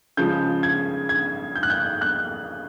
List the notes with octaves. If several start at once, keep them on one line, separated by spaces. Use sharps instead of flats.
C#3 F3 G#3 G6
G#6
G#6
G6
F#6
G6
F#6